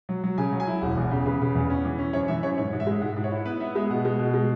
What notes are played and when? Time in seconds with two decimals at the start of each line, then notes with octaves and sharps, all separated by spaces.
0.09 F#3
0.24 F#3
0.38 C#3 G#5
0.53 F#3
0.60 G#5
0.67 E4
0.82 E1 F#5
0.97 E2
1.11 C#3
1.26 C#3 B4
1.41 C#3
1.55 E2
1.70 C#4
1.85 E3
1.99 C#4
2.13 F#2 C#5
2.28 E3 E5
2.43 F#2 C#5
2.58 G#2 C#5
2.73 G#2
2.80 E5
2.87 G#3
3.02 G#2 F#5
3.16 G#2
3.24 C#5
3.31 E4
3.45 B3 B4
3.60 B3 E5
3.75 G#3 E5
3.90 B2 F#5
4.05 G#3
4.19 B2
4.34 G#3